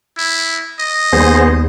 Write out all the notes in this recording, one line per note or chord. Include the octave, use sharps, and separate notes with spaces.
E4
D#5
D#2 G3 B3 G#4 C5